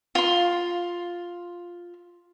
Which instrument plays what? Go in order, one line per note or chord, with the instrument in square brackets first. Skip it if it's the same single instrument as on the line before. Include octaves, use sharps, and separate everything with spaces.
[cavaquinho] F4 C6